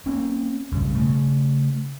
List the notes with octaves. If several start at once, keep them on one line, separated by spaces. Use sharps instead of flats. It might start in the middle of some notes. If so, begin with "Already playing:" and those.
A#3 C4 C#4
B1 G2 C#3
C#3 A3